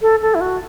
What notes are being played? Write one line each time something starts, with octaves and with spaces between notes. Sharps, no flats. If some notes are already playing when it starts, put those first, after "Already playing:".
A4
A4
E4
F#4